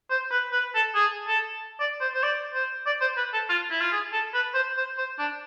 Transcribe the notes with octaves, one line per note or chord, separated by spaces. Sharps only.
C5
B4
B4
A4
G#4
A4
D5
C5
C5
D5
C5
D5
C5
B4
A4
F4
E4
F4
G#4
A4
B4
C5
C5
C5
D4